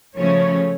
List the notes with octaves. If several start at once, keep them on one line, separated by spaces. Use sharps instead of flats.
C#3 F3 A3 C#4 C#5